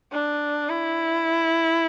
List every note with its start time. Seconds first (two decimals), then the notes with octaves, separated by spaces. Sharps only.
0.12 D4
0.69 E4